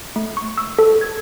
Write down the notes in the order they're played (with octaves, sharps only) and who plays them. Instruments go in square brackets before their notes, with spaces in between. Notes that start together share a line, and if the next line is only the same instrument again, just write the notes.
[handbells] A3
C#6
E6
A4
G#6